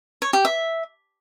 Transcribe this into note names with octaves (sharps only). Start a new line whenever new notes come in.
C#5
G4
E5